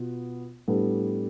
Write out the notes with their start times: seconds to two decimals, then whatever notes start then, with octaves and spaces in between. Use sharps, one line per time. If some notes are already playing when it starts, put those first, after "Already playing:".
Already playing: B2 B3 F4
0.68 A2 G3 B3 D4 A4